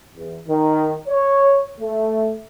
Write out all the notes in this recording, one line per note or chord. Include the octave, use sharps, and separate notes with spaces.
E2
D#3
C#5
A3